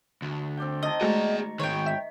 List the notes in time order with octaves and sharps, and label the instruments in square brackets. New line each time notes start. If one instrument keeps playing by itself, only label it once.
[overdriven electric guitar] D2
[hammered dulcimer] C4 D5 G5
[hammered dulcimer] D#3 A5 [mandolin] D#5
[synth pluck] G#3 A3 F#4 [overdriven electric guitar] G#4 D5 [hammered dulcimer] A#5 C#6
[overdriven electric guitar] G#2 D#3 [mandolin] C#5 G5
[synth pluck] E5 B6